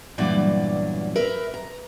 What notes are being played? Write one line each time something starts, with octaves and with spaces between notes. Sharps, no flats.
E2 G2 A#2 F#3 D5
A#4 B4 E5
A#5